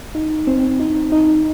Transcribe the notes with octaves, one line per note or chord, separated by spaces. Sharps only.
D#4
C4
D#4
D#4